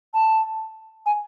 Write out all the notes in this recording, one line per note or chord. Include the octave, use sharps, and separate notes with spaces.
A5
G#5